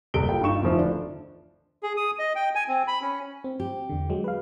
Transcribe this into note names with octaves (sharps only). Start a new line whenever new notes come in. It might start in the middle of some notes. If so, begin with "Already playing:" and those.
F#1 C2 G4 A4 D7 G7
F4 G5
G2 D#4 F4 C#6 E7
F1 D2 E3 F3
D3 D4
G#4
D#6
D#5
G5
G#5
C4
B5
C#4
C4
G4
E2 D3
F#3 G#3
B4 F5